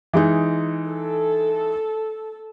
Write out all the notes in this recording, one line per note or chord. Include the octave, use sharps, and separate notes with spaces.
E3 G#3 D#4
A4